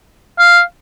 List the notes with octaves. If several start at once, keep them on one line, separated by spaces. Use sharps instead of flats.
F5